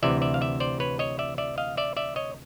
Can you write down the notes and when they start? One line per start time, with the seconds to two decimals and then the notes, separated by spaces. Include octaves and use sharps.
0.03 D2 C3 E3 D5 E5
0.22 D5 E5
0.34 F5
0.41 D5 E5
0.60 C5 D5
0.80 B4 C#5
0.99 C#5 D#5
1.19 D5 E5
1.38 D5 E5
1.58 D#5 F5
1.77 D5 E5
1.97 D5 E5
2.16 C#5 D#5